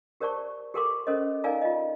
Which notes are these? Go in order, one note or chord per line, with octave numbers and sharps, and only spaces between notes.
G4 A#4 C5 D5 A5 C#6
G4 A4 A#4 G5 C6 D6
C#4 A4 A#4 C5 D#5
D#4 A#4 D5 F5 G#5 A#5
F4 D#5